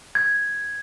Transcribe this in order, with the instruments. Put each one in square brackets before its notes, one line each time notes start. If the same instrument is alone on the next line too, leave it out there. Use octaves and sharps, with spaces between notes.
[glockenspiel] G#6